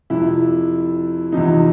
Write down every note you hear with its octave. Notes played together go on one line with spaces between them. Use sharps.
F2 C3 F3 E4
E2 C3 F3 D#4